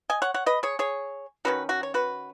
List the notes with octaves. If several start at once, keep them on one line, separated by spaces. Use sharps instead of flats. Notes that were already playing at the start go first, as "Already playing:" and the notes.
D#5 G#5
C#5 F#5
C#5 F#5
B4 D#5
G#4 C#5
G#4 C#5
D#3 F#3 C#4 F#4 B4
F#4
C#5
F#4 B4